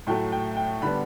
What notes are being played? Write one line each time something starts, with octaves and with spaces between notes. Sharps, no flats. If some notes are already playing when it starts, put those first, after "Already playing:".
A2 F#3 A3 G5
G5
G5
D3 G3 B3 B5